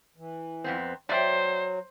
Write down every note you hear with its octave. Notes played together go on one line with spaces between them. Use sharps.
E3
F2 B3 C4
F#3 C5 D5 E5 G5